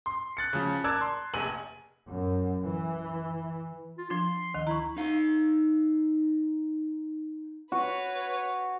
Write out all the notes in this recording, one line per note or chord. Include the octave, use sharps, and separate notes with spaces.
C6
F#6 A6 C#7
C#3 F3
A#4 D5 A5 E6 F#6 G#6
C6
F1 A#1 G#5 D#7 F#7
F#2
E3
F4
F3 D4 C6
D2 D#3 D#5
E4 A#5 C#6
D#4 F5
F#4 B4 C#5